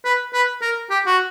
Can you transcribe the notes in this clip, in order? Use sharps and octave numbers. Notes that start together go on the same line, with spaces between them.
B4
B4
A#4
G4
F#4